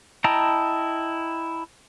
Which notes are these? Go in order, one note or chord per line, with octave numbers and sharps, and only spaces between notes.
E4 D#5 G5 A5 A#5